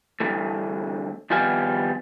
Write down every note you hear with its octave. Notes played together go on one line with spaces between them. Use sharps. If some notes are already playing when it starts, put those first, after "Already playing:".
D2 G2 D3 E3 A3
D#3 F3 G3 B3 F5 G#5